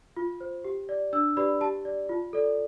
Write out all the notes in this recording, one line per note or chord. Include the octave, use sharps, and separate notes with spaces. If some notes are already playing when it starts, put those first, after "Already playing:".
F4
C5
G4
D5
D4 E6
G4 B4 D5 B5
G4 A5
D5
F4
A4 D5